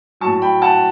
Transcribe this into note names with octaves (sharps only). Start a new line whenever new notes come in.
A2 F#3 A5 C#6
G5 B5
F#5 A5